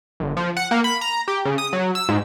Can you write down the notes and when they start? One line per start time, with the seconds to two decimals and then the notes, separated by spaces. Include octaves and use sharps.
0.20 G1
0.37 F3
0.57 F#5
0.71 A#3
0.84 B5
1.01 A#5
1.28 G4
1.45 C#3
1.58 D#6
1.73 F#3
1.95 E6
2.09 G#2